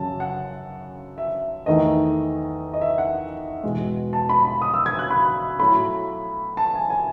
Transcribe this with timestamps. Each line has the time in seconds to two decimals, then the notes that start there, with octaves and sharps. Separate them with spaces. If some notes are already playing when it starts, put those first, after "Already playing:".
Already playing: F#2 C#3 F#3 C#4 A5
0.20 F#5
1.18 E5
1.66 E2 D#3 A3 D#4 D#5
2.74 D#5
2.81 E5
2.98 F#5
3.63 E2 B2 G#3
4.13 A5
4.29 B5
4.45 B5
4.62 D#6
4.74 E6
4.86 G#6
4.99 F#6
5.10 B5
5.59 A2 F#3 A3 B5
6.57 A5
6.75 G#5
6.90 G#5